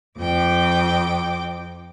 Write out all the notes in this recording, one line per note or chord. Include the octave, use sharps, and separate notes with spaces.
F2 G5 D6